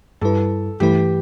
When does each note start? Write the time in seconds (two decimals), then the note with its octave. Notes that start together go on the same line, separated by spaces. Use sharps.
0.21 G2 G3 E4 A4 B4
0.80 G2 E3 A3 E4 G4 B4